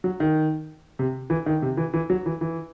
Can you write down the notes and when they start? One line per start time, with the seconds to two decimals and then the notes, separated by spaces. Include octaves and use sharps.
0.04 F#3
0.20 D#3
0.99 C3
1.30 E3
1.46 D#3
1.62 C3
1.77 E3
1.94 E3
2.10 F#3
2.26 E3
2.41 E3